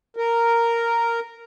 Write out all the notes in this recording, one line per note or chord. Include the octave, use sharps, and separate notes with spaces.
A#4